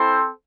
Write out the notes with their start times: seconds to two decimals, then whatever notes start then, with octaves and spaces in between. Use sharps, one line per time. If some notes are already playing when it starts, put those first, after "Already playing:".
Already playing: C4 E4 A4 C5